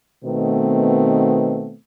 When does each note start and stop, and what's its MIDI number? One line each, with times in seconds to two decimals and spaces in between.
0.25 1.76 47
0.25 1.76 51
0.25 1.76 57
0.25 1.76 59
0.25 1.76 60